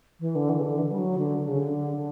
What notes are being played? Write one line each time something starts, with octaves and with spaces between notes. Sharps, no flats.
E3
D3
E3
C#3
D3
E3
G3
F#3
D3
D3
C#3
D3
D3